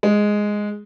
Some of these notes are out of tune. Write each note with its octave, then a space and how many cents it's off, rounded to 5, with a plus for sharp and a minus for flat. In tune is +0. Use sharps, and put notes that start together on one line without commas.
G#3 +0